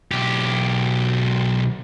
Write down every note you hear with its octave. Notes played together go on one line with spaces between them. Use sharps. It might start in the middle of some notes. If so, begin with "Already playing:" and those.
B1 G4